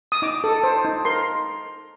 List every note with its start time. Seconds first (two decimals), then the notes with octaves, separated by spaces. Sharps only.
0.12 D#6
0.22 D#4 D6
0.44 A4
0.64 C5
0.85 D#4
1.05 A#4 C6